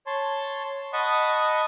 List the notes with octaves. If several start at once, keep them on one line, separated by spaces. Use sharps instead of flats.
C#5 A5 C6
D#5 F#5 A5 B5 C#6 D#6